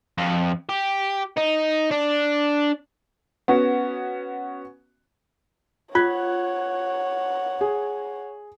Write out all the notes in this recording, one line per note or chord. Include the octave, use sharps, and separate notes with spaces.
F2
G4
D#4
D4
B3 C#4 F#4
F4 C#5 F#5 F#6 G#6
G#4